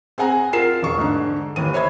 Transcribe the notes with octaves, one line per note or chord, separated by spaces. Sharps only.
C4 G#4 F#5 G#5 A#5
F4 A#4 C7 E7
E1 C#6
G#2 D3 D#4
D#2 E3 D#7
C5 C#5 E5 B5 G#6